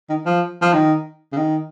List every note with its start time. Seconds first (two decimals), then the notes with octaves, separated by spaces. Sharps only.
0.10 D#3
0.26 F3
0.62 F3
0.73 D#3
1.33 C#3
1.37 D#3